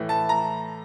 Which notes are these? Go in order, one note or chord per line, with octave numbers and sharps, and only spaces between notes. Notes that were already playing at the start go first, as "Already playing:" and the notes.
Already playing: A2 E3
A5
A#5